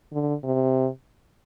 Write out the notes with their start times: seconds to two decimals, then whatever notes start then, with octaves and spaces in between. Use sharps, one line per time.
0.12 D3
0.43 C3